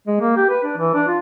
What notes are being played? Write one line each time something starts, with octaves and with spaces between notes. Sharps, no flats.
G#3
A#3
G4
B4
D4
E3
D4
F4